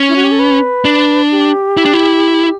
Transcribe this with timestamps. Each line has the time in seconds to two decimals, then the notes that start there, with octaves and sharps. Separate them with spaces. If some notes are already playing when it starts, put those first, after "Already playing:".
Already playing: C#4
0.09 E4
0.16 F#4
0.24 G4
0.32 A4
0.39 B4
0.85 D4
1.31 G4
1.77 E4
1.85 D4
1.93 E4